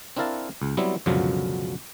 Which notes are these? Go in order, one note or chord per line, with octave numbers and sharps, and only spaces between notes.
C4 D4 E4 A#4 F5 A5
C#2
F#3 G3 B3 C4 E4
C#2 F#2 B2 D3 F3 F#3